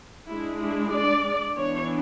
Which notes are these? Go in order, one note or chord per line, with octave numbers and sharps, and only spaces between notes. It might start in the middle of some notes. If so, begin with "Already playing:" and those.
G#3 D4 E4
E4
D5
E3 B3 D4 C#5